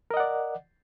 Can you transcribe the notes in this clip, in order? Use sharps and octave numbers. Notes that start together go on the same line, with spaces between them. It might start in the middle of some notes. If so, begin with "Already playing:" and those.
A#4 D5 D#5 F#5